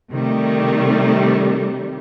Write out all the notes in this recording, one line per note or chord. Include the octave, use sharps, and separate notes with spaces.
C3 D#3 G3 A3